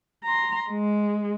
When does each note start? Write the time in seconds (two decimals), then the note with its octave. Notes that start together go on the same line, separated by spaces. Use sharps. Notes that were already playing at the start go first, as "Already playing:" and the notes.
0.24 A#5 C6
0.69 G#3